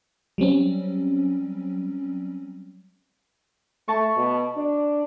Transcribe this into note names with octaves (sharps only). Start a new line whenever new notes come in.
F#3 G3 C4 C#4
A3 A5 C#6
B2
D4